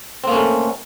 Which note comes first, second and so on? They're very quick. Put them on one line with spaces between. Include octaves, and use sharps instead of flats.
C4 A#3 C#4 A3